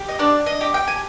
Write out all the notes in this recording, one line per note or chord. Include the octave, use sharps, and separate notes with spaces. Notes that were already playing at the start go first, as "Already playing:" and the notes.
Already playing: G4
D#5
D4 D5
D#5
G4
G5
G#5